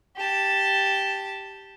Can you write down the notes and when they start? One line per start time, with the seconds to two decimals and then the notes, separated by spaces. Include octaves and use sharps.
0.17 G4 A5